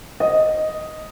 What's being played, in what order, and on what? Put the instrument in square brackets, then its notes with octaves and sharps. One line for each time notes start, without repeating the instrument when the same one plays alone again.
[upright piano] D#5